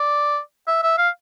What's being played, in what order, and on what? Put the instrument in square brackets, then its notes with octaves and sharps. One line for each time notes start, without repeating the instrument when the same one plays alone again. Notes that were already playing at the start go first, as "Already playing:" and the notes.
Already playing: [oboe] D5
E5
E5
F5